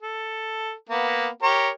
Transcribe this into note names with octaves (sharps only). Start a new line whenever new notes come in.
A4
A#3 B3
G4 A#4 C#5